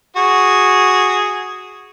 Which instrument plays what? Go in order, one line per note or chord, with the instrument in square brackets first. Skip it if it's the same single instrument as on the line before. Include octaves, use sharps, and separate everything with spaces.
[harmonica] F#4 G#4